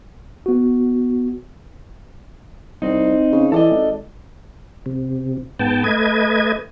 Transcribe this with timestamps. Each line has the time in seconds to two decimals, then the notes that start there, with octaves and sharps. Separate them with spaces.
0.46 B3 F#4
2.82 C2 C4 D#4
3.32 C#3
3.52 E3 A4 D5 D#5
3.71 G#1
4.86 C3
5.59 G#2 B3 G5 A5
5.84 A3 B4 D#5 G#6